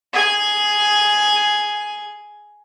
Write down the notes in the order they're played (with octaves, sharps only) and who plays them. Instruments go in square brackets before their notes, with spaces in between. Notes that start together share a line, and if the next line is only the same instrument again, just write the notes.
[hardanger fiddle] G#4 G#5